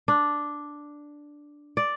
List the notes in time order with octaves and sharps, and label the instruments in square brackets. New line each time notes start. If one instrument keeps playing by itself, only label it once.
[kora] D4
D5